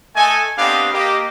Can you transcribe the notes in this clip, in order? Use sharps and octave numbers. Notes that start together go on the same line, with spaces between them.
A3 A4 D#5 G#5
B3 C4 D4 G4 D#5 F5
A#3 G4 D#5